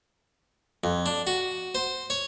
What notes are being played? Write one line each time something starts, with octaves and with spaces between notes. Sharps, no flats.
F2
D4
F#4
C5
C#5